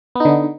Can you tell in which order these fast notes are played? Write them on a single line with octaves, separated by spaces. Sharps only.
B3 D#4 D3